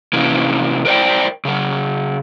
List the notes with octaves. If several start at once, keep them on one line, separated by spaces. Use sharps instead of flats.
C3 E3 A#3 C#4
A#4 C5 D5 G5
C#3 A#4